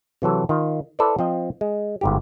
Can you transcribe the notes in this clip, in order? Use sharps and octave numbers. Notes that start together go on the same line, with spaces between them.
C3 E3 F#3 A4
D#3 F4
E4 A4 B4 C5 D5
F3 C4 D#5
G#3
G1 G#2 G4